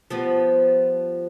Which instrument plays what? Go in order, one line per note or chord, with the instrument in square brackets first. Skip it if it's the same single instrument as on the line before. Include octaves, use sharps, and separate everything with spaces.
[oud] F3 G3 B3